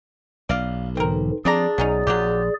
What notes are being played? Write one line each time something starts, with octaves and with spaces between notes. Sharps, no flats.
B1 D5 F5
G#2 D3 E3 C4 A#4
D3 F3 C4 D4 G#4 D5 A#5
B1 F#3 C#4 D#4
A#1 F#3 F4 G4